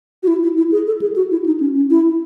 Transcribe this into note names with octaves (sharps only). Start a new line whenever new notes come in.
F#4
E4
E4
E4
G#4
A4
G#4
F#4
E4
D#4
C#4
C#4
E4